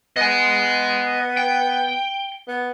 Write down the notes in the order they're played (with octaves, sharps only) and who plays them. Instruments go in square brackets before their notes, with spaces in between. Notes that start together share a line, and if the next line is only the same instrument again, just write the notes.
[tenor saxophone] B3 [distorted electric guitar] D#5 G#5
[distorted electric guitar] G5
[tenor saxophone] B3